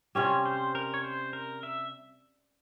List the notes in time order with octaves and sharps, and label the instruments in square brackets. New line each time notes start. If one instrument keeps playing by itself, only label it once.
[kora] C3 G3 C#4 F4 [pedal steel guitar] C#5
[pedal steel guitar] C5
A#4
C#5
C5
A#4
E5